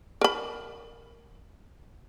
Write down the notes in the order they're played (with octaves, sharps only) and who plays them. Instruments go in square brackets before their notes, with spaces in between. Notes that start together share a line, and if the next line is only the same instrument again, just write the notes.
[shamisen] A#4 B5